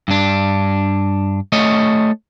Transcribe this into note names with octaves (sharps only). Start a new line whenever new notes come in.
G2 D4
A3 C#5 D#5